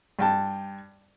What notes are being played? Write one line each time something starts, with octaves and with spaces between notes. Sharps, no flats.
G2 G5 A5